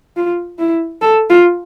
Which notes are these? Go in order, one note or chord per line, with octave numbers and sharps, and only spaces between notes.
F4
E4
A4
F4